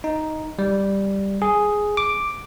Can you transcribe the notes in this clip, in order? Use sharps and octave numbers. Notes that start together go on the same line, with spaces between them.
D#4
G3
G#4
D6